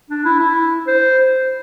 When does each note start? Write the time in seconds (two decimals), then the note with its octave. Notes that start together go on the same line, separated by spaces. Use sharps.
0.10 D4
0.25 E4
0.40 E4
0.87 C5